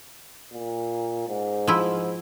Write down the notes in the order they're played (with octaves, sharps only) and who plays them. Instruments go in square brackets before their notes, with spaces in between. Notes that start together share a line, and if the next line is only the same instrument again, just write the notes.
[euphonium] A#2
G#2
[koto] F3 E4